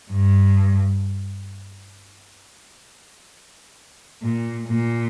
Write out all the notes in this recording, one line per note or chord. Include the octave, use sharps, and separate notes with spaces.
G2
A#2
A#2